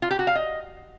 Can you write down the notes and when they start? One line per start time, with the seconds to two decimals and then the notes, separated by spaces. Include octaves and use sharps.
0.02 F4
0.11 G4
0.19 F#4
0.27 F5
0.35 D#5